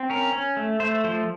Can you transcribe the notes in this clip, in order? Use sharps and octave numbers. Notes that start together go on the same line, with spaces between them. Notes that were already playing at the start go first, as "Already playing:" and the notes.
Already playing: C4
C#4 A#4
C#4
A3
A3 C5
F3 C5